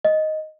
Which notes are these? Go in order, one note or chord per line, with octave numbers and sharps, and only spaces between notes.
D#5